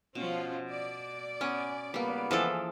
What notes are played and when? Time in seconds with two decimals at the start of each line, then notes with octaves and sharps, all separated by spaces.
0.15 B2 F3 C#4 F4
0.70 D5
1.41 B3 C#4 G#5
1.94 C#2 G3 A#3 B3
2.31 E3 F3 G#4 A4 D6